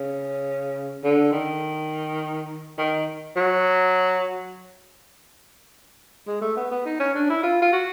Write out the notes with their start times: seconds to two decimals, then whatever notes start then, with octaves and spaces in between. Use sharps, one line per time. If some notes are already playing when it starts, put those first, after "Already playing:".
Already playing: C#3
1.04 D3
1.32 D#3
2.78 D#3
3.36 F#3
6.27 G#3
6.41 A3
6.56 B3
6.71 B3
6.85 D#4
6.99 C#4
7.15 D4
7.30 E4
7.43 F4
7.61 F4
7.72 F#4